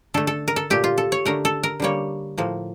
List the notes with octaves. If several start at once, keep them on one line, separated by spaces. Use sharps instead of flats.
D3 A3 A4
A4
A#4
A4
A#2 A3 G4
F4
A4
C#5
D3 A3 A#4
A4
A#4
D3 G3 A#3 C#5
A2 F3 A#3